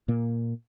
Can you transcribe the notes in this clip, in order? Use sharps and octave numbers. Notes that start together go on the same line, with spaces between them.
A#2 A#3